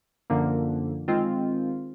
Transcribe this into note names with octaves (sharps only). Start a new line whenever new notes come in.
F#2 D3 F3 A#3
D#3 G#3 C4 F4